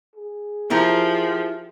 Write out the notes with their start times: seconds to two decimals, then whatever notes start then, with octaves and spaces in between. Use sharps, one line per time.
0.15 G#4
0.70 F3 E4 G4 A#4